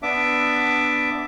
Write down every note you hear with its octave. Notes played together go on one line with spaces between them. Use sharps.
B3 D4 E5 D6